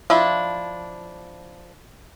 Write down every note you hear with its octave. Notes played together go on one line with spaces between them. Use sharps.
F3 D4 E4